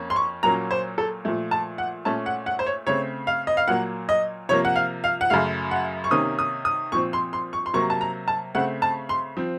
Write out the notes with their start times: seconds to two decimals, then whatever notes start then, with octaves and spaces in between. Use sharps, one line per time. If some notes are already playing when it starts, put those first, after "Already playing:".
Already playing: F2 A#3 C#4
0.10 C6
0.16 C#6
0.43 A#2 F#3 A#3 C#4 A#5
0.71 C5
0.98 A4
1.25 A#2 F3 A3
1.51 A5
1.78 F#5
2.05 A#2 A3 C#4 A5
2.26 F#5
2.46 F#5
2.59 C5
2.66 C#5
2.87 C#3 A3 C4 C#5
3.27 F5
3.47 D#5
3.57 F5
3.68 A#2 F#3 A#3 F#5
4.09 D#5
4.49 C3 F3 A#3 C#5
4.65 F#5
4.76 F5
5.04 F5
5.21 F#5
5.30 F#2 C#3 F#3 A3 F5
5.71 F#5
6.04 C#6
6.11 C3 D#3 A#3 C#4 D#6
6.39 D#6
6.65 D#6
6.92 A#2 F3 C4 C#6
7.13 C6
7.33 C6
7.53 C#6
7.66 C6
7.73 C3 F#3 A#3 C#6
7.90 A5
8.01 A#5
8.28 A5
8.55 C#3 A3 C4 F#5
8.82 A5
9.09 C6
9.37 F3 C4